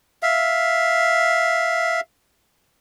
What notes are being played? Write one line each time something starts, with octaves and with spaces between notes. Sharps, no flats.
E5 F5